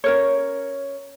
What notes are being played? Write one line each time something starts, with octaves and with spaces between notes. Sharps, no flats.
C#4 A#4 C#5